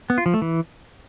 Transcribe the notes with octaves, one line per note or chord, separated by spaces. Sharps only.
B3
F4
F3
A3
E3